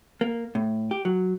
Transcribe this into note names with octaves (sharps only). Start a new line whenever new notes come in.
A#3
A2
G4
F#3